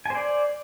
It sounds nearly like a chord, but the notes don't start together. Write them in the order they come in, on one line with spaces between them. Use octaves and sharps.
G#5 C5 D5